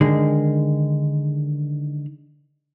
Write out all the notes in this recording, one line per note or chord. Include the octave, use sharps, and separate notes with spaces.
D3 D#3 G#3